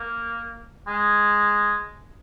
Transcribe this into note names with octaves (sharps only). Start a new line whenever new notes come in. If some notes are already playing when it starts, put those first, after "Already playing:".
Already playing: A#3
G#3